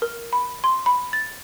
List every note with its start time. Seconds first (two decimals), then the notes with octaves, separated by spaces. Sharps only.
0.02 A#4
0.33 B5
0.64 C6
0.86 B5
1.13 A6